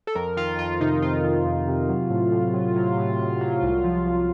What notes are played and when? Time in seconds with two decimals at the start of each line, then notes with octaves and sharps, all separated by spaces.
0.07 A4
0.15 F2 A#4
0.37 D#3 F4
0.59 F2 F4
0.81 C3 D#4
1.02 F2 F4
1.24 D#3
1.45 F2
1.68 C3
1.89 F#3
2.10 A2
2.32 A2
2.54 F#3
2.76 F#3
2.97 A2
3.19 A2
3.41 F#3
3.62 C2
3.84 F3
4.06 C2